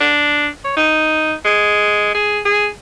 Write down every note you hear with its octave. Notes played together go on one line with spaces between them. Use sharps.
D4
C#5
D#4
G#3
G#4
G#4